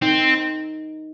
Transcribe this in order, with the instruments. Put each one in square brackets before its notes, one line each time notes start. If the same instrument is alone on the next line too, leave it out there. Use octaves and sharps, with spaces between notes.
[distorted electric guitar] C4 [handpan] D#4